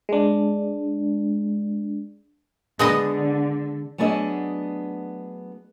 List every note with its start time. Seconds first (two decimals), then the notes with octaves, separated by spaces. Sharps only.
0.09 G#3 D4
2.79 D3 G#3 B3 D#5
3.98 F#3 A3 B3 D4 G#4 D#5